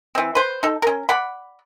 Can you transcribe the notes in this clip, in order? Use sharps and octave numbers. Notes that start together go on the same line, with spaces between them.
E3 C4
B4 C5
D#4 A4
C#4 A#4
D5 F#5 B5